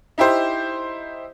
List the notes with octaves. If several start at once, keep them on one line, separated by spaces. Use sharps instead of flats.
D#4 E4 G4 C5